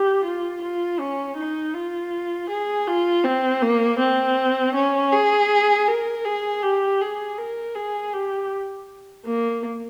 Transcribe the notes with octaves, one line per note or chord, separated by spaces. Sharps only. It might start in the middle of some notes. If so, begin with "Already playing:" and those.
Already playing: G4
F4
F4
C#4
D#4
F4
G#4
F4
C4
A#3
C4
C#4
G#4
A#4
G#4
G4
G#4
A#4
G#4
G4
A#3